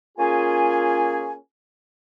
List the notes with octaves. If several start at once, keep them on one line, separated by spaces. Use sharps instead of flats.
A#3 C#4 F4 G#4 G#5